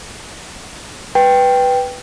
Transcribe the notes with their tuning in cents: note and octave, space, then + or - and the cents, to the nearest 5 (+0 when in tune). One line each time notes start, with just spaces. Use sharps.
B4 +0 G5 +0